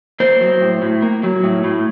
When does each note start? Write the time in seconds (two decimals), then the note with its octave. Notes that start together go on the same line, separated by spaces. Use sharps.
0.20 A#3 C5
0.41 F#3
0.61 A2
0.82 A2
1.02 A#3
1.23 F#3
1.43 A2
1.64 A2